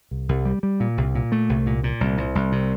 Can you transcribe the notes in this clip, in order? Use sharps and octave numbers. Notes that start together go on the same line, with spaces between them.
C2
C2
G3
G3
A#2
C2
A#2
A3
C2
A#2
A#2
C2
C2
C2
C3